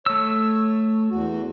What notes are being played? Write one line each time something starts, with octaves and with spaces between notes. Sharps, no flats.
A3 C#5 E6
E2 F#4